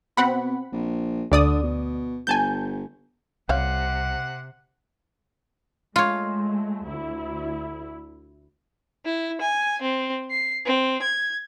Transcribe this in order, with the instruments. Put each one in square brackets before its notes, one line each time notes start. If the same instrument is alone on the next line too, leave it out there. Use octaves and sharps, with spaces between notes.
[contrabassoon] B2 [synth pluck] C4 F#5 B5
[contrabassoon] A#1
[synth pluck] D2 D5 D#6 [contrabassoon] D3
[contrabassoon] B2
[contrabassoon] G1 [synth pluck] G#5 A5 G6
[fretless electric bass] C2 [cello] C3 [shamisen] C5 C#5 F5 [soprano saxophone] F#5
[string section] G#3 A3 [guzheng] F4 C#5
[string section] D2 E4
[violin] E4
G#5
C4
C7
C4
G#6